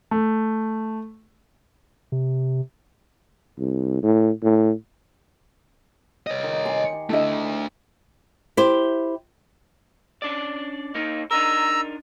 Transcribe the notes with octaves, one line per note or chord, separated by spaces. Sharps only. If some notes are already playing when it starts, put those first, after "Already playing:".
A3
C3
C2
A2
A2
C#5 D#5
D#3
G#5 C6
G4
A3 D4 E4 A4 D#5
E4 G4 C5
C#4 D4 D5
A#3 D#4
D4 D#4 A#4 A#5 E6